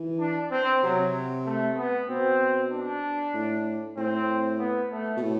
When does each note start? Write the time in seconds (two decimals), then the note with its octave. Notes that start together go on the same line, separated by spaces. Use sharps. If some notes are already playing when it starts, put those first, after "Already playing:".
Already playing: E3
0.20 D4
0.51 C4
0.83 C3 F#3
1.46 A3
1.76 B3
2.09 B2 C4
2.71 D4
3.34 A2
3.97 A2 C4
4.59 B3
4.92 A3
5.17 B2
5.23 A2